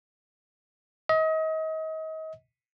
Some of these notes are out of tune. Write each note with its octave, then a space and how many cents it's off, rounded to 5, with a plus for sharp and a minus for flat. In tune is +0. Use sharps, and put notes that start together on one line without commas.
D#5 +35